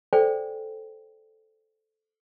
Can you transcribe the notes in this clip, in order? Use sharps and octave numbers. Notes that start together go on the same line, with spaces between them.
A4 C5 D5 G5 G#5